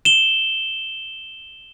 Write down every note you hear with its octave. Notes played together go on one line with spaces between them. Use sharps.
E7 G7